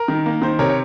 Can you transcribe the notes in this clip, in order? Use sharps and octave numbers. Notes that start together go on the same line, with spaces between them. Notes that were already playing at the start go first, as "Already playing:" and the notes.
Already playing: A#4
D#3
A#3
D#3 C5
C3 A#4 C#5
C#5